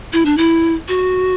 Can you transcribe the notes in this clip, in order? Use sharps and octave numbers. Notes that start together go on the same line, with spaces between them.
E4
D4
E4
F#4